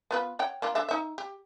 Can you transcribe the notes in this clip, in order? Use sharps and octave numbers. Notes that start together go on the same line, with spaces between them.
B3 F4 B4
C#5 F#5 G5
A#3 D4 F4
D4 A4 E5
D#4 E5
G4